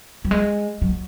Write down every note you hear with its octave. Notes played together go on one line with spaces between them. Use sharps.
G3
G#3
F#3